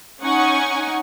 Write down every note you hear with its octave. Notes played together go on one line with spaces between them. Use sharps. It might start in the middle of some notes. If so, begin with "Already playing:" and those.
C#4 D#4 F#5 G#5 C#6